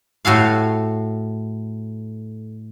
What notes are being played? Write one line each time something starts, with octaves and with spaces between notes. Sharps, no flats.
A2 F#4 A4 F5